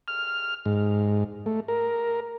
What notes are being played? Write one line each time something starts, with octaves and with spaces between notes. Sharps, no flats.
F6
G#2
A3
A#4